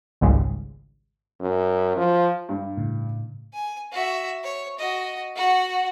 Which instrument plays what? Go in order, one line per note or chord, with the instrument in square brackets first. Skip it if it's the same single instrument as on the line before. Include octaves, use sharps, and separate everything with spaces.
[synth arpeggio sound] G#1 C#2 G#2 C#3 G3 G#3
[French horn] F#2
F3
[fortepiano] G2
[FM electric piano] A2 C#3
[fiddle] G#5
F#4 E5
C#5
F#4 D#5
F#4 F#5